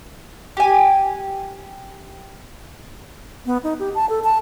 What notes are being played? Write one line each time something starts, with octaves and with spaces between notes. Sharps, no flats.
G4 G#5
B3
D#4
G4
A5
A4
A5